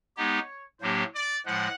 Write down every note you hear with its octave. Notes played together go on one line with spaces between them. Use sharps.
G#3 B3 D#4 G4 C#5
A2 F#3 A#3 D4 G4 C5
D5
A2 F3 G#3 F#5